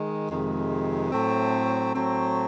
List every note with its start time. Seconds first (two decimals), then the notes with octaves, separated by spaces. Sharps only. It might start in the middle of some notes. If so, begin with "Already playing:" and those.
Already playing: D#3 G#3
0.29 F2 C3 D#3 G#3
1.11 A2 F#3 A3 C4
1.94 A2 F#3 A3 C4